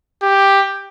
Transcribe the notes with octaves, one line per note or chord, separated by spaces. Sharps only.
G4